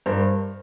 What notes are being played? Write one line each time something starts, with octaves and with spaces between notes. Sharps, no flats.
G2 A#4 C5